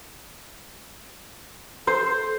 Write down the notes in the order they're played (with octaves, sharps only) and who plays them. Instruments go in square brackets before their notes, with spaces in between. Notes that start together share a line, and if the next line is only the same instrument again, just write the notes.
[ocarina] A4 [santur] C5